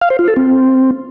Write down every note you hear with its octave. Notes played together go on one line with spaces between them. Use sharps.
F5
C5
F4
A4
C4